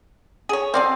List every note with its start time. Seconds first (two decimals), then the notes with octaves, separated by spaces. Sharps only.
0.49 G#4 C#5
0.74 B2 C4 D5 F5